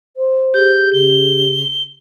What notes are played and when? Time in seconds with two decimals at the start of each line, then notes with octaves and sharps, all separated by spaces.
0.17 C5
0.54 G4 G#4 G6
0.93 C#3 G7